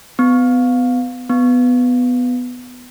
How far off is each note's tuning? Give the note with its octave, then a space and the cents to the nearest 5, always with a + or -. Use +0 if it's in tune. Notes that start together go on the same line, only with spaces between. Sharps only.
B3 +25
B3 +10